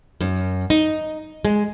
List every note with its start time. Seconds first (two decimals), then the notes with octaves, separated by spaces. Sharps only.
0.21 F#2
0.70 D#4
1.45 G#3